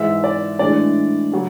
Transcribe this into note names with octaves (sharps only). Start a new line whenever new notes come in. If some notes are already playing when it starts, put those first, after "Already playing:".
Already playing: G#2 E3 G#3 E5
D5
A2 E3 G#3 D4 D5
C#3 F#3